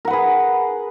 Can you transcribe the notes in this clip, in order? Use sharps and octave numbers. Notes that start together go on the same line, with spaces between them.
G#4 A#4 B4 F#5